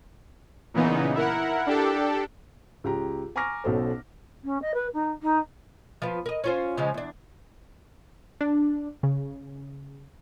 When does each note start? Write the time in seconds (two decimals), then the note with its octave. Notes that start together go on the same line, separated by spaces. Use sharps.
0.74 A#2 C#3 E3 B3 D#4
1.15 E4 A#4 F#5
1.67 D4 G4 A4
2.84 C#2 G4 A#5
3.36 G#5 A#5 C#6 D6 F6 A#6
3.64 B1 B2 C#4 A4 C5
4.44 C#4
4.61 D#5
4.74 B4
4.93 D#4
5.22 D#4
6.02 F3 B3 F4
6.26 A#4 D#5
6.44 C#4 F4 C5
6.77 C#3 F3 G#3
6.94 E2 D4
8.41 D4
9.03 C#3